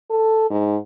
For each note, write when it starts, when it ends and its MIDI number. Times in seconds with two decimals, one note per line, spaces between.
0.10 0.48 69
0.50 0.76 44